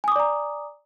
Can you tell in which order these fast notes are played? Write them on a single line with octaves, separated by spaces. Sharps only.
G#5 D#6 D6 D5 A#5